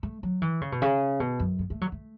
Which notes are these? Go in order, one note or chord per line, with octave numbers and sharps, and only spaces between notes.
A3
F#3
E3
C#3
B2
C#3
B2
F#2
B3
A3
F#3
A3